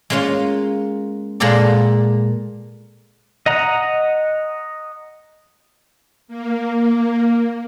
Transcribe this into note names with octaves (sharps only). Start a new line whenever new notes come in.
G#3 A#3 C#4 F4
A#2 G#3 A#3 A4 D5
D#5 F#5 A#5
A#3